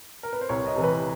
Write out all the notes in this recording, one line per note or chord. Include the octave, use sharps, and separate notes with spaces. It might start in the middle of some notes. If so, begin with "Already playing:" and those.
A#4
B4
C5
C2 C#5
D#5
C3 E3
B4